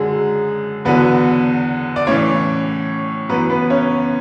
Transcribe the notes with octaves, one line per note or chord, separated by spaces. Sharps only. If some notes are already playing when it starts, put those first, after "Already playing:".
Already playing: F#2 D3 F#3 G#3 G#4
E2 D3 F#3 B3 B4
D5
A2 E3 C#4 C#5
F#2 E3 B3 B4
B3 B4
C#4 C#5